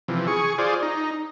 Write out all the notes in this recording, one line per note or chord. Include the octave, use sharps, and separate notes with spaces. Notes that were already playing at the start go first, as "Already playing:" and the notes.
C3 E3 F3
G#4 C#6
F4 G#4 C5 D5
D#4